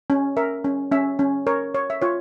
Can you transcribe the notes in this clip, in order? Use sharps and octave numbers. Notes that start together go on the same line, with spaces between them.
C#4
A#4 E5
C#4
C#4 E5
C#4
A#4 C#5
C#5
E5
F4 C#5